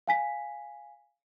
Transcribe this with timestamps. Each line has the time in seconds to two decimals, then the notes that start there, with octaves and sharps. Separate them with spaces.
0.07 F5 G#5 B6